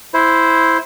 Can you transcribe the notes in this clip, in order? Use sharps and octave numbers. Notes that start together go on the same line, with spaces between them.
E4 C5